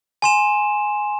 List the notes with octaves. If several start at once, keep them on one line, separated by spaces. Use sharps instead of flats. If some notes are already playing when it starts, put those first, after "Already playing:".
G#5 C6 E7